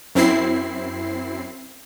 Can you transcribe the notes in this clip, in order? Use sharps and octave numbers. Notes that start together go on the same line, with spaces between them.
F#2 C4 E4 C7